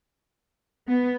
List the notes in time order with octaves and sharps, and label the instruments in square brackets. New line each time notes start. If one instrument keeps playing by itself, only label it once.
[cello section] B3